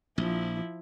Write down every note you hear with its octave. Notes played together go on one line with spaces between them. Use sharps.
A#1 F3 E4